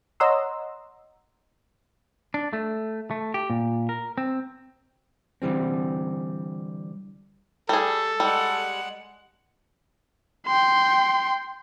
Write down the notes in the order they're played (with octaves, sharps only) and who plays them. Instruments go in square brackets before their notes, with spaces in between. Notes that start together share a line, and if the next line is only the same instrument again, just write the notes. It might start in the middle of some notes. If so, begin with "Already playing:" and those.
[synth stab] C#5 D#5 F#5 A#5 C6 E6
[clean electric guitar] D4
A3
A3
G4
A#2
A#4
C4
[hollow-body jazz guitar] D3 E3 G3 C4
[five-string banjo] G3 G#4 [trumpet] A4
[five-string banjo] G3 [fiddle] G#3 F#5
[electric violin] G5 C6